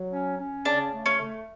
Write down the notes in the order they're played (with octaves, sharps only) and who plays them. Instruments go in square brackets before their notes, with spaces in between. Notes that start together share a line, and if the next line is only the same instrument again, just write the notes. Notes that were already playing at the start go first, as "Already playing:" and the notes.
Already playing: [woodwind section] F#3
C#4
C#4
[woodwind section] C#3 [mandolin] D4
[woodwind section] A3
[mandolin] C#4
[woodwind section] A3